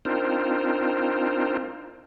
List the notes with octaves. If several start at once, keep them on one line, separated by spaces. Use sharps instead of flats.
C4 D4 D#4 F4 A#4 C5